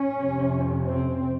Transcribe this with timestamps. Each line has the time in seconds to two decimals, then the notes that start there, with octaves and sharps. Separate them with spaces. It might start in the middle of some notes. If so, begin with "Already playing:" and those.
Already playing: C#4
0.19 F2 C3
0.87 C4